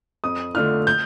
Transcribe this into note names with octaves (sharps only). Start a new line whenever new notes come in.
F2 D#6
D3 A3 D4 F4 F6
G6